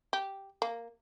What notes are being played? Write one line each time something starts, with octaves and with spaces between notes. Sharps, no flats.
G4
A#3